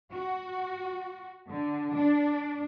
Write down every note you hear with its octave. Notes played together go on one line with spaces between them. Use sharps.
F#4
D3
D4